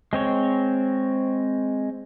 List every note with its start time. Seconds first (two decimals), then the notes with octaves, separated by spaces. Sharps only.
0.13 G#3 C4 C#5